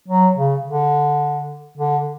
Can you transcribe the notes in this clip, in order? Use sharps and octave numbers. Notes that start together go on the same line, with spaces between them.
F#3
C#3
D3
D3